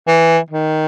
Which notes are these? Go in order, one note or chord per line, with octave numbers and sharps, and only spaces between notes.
E3
D#3